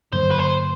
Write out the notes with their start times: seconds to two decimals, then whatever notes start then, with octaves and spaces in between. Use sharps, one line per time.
0.12 G2 D3 F#3 A#3 C5
0.30 B4
0.38 C5